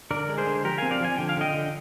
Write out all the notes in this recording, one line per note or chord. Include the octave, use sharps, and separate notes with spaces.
D3 A#4 D5
G#3
G#4 C5
D3
F3 G4 A#4
C4 F5 G#5
D5 F5
F3 G#5
D3 G5
F5
D3 D#5 G5
D3